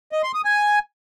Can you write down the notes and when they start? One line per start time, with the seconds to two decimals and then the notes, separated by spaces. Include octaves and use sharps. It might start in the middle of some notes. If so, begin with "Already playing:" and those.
0.12 D#5
0.23 C6
0.34 D#6
0.45 G#5